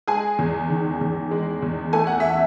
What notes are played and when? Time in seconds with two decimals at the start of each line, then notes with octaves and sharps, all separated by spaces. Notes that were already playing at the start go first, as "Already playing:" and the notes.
0.07 G#3 G#4 G#5
0.39 E2
0.70 D#3
1.01 E2
1.31 G#3
1.62 E2
1.93 A3 G#5
2.07 F#5
2.20 E5